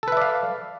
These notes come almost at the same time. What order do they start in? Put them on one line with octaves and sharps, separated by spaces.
A4 B4 E5 D5 F5